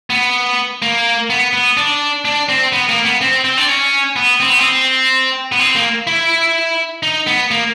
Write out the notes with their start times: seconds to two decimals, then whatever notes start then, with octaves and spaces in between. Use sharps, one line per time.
0.10 B3
0.82 A#3
1.30 B3
1.53 B3
1.77 D4
2.25 D4
2.49 C4
2.72 B3
2.89 A#3
3.05 B3
3.21 C4
3.45 C4
3.57 D4
3.68 C#4
4.16 B3
4.40 C4
4.50 B3
4.59 C4
5.52 B3
5.59 C4
5.75 A#3
6.07 E4
7.03 D#4
7.27 B3
7.51 A#3